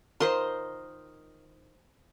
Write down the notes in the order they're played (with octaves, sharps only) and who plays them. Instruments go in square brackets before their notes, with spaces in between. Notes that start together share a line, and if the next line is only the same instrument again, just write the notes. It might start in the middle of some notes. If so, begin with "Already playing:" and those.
[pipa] D#3 F4 A#4 [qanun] C5 D#5 C6